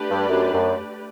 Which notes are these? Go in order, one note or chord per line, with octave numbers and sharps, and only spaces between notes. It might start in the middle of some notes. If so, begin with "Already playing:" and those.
Already playing: A3 D4 G4 B4 D5
G2
F#2
F#2